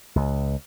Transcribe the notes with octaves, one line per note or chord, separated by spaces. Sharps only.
C#2